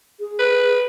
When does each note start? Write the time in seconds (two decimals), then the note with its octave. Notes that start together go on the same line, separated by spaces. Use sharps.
0.20 G#4
0.39 B4